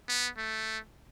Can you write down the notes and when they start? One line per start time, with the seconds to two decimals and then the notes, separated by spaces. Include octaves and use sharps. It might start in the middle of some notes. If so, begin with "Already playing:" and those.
0.08 B3
0.37 A3